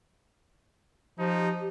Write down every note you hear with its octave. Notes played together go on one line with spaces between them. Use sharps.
F3 D#4 G4